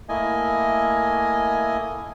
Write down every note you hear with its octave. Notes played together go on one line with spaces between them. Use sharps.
A3 A#3 E4 D#5 G#5